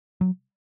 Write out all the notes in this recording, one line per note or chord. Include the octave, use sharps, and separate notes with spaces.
F#3